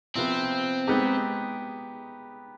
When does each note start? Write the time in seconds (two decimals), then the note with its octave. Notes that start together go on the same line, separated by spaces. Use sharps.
0.15 C3 F3 B3 C4
0.88 G#3 B3 D#4 G4